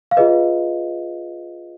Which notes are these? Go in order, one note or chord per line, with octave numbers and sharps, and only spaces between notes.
F5
F4 G#4 B4 D#5